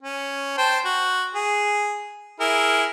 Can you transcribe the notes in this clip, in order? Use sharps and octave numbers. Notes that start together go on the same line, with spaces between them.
C#4
C5 G5 A5
F#4
G#4
E4 G#4 A#4